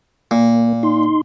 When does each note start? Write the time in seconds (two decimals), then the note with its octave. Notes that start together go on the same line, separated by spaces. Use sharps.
0.31 A#2 A#3
0.83 D#4 C6